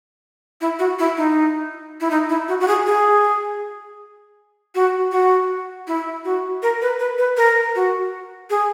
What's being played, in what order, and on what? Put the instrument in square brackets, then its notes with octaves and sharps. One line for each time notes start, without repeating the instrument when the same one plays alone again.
[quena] E4
F#4
E4
D#4
E4
D#4
E4
F#4
F#4
G#4
G#4
F#4
F#4
E4
F#4
A#4
B4
B4
B4
A#4
F#4
G#4